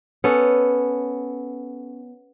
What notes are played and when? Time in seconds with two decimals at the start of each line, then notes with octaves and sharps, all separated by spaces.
0.24 B3 C#4 A4